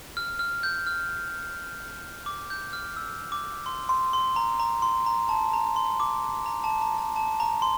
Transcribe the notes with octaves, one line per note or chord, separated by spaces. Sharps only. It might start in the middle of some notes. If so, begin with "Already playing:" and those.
F6
F6
G6
F6
D6
G6
F6
E6
D6
C6
C6
C6
A#5
A#5
C6
A#5
A5
A#5
C6
D6
A#5
A5
A#5
A5
A5
A#5
C6